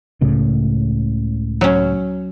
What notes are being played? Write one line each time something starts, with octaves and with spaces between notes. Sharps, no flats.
C#2 A2 C#3
F#3 C#4